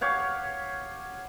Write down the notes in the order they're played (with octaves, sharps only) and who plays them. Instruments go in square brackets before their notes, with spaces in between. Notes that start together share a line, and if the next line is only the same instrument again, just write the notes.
[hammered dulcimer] G4 C#5 F5 F#5